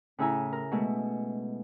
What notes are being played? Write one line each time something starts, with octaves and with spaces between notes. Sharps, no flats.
A2 C#3 E4 E5 G#5 A#5
A#4
B2 G#3 A3